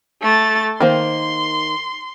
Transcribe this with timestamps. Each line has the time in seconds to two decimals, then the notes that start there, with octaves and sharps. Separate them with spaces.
0.21 A3 A6
0.80 D#3 A#3 C5 C6